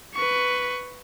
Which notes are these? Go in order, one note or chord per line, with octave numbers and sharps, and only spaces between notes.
B4 C#6